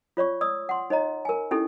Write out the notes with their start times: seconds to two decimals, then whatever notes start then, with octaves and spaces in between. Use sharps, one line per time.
0.17 F4 C#5 D5 C#6
0.41 D5 D#6 E6
0.69 F#5 C6
0.90 D#4 C#5 D#5 A#5
1.25 A#4 G#5
1.51 C#4 D#4 E4 G4 A4